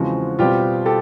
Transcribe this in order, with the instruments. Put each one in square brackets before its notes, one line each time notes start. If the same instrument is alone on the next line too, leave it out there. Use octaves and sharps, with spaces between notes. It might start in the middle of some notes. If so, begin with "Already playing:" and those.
Already playing: [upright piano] E2 C#3 F3 G#3 C4 [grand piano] F#4
[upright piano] B2 G3 C4 [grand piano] F4 G4
[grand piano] G4 A4